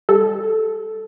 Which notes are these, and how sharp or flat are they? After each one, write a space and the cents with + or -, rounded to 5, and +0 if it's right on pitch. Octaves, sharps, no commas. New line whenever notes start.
G3 +40 A4 +0